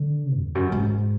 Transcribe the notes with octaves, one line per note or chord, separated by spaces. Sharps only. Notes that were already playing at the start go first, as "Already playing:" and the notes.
Already playing: D3
E2
F#2
G#2